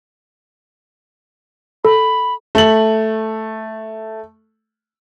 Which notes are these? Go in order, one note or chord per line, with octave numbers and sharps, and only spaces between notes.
A4 B5
A3 F#7